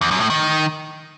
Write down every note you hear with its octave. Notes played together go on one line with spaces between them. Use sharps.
E2
F#2
A2
D#3